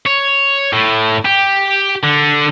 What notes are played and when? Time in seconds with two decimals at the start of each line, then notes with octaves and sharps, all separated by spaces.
0.06 C#5
0.73 A2
1.25 G4
2.04 D3